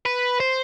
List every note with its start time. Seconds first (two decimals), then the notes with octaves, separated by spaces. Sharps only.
0.06 B4
0.40 C5